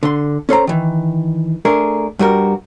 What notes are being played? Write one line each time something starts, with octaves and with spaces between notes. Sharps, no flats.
D3 C6
C#4 A4 C5 A#5
D#3 E3
A3 D4 G#4 A#4
G2 G3 F#4 A#4